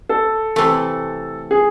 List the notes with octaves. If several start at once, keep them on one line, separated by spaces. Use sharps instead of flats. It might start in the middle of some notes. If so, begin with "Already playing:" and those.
A4
C3 E3 A3
G#4